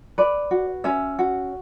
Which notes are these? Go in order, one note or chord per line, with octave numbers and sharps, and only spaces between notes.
B4 D5
F#4
C#4 E5
F#4